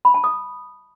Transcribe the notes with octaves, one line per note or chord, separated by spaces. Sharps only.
B5
A5
D#6